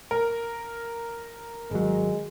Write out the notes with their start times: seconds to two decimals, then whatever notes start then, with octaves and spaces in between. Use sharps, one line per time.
0.11 A#4
1.71 G#1 F#3 G#3